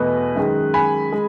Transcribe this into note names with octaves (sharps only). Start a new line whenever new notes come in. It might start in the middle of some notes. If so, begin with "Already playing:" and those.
Already playing: E2 B2 A3 B4 D#5
F#2 D#3 G#3
G#5 B5
G#3